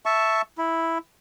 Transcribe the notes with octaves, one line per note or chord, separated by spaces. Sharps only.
E5 A5 C#6
E4